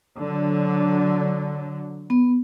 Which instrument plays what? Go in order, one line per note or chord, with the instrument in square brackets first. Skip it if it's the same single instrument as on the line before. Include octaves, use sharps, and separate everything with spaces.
[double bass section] D3 F#3
[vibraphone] B3